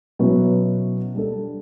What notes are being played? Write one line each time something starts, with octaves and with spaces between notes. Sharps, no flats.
B2 F#3 C#4 E4 B4
G3 D4 A4